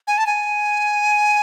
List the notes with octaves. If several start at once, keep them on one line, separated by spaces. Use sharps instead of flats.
G#5
A5
G#5